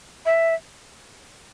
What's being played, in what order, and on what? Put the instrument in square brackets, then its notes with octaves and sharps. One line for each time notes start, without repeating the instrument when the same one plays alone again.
[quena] E5